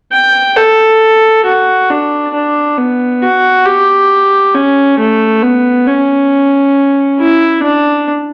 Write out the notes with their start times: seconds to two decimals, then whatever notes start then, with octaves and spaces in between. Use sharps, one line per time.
0.12 G5
0.56 A4
1.45 F#4
1.90 D4
2.34 D4
2.78 B3
3.22 F#4
3.66 G4
4.54 C#4
4.98 A3
5.43 B3
5.87 C#4
7.20 E4
7.63 D4